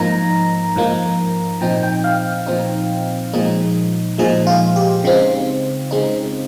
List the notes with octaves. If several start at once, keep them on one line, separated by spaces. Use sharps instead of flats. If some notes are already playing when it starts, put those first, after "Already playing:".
Already playing: G#2 F3 A#3 D#4 A#5
G#2 F3 A#3 D#4
A#2 F3 C4 D#4 G5
G5
F5
A#2 F3 C4 D#4
A#2 F3 G#3 D#4
A#2 F3 G#3 D#4 G#4
F4
G4
C#3 G#3 C4 D#4 F4
C#3 G#3 C4 D#4